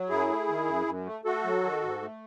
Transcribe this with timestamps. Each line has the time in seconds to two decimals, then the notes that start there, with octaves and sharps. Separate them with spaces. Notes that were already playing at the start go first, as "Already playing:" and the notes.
Already playing: F#3
0.09 F#2 E4 G#4
0.28 A3
0.48 D#3
0.67 F#2
0.86 F#2
1.06 A3
1.25 A3 F#4 A4
1.44 F#3
1.63 D#3
1.83 G#2
2.02 A3